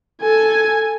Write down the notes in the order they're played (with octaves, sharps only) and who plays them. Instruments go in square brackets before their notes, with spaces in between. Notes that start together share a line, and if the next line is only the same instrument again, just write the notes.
[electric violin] A4 G#5